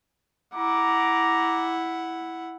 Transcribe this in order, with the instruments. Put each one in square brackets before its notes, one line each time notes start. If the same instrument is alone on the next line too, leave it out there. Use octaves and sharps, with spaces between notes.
[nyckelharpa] E4 F#5 [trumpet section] A#5 D6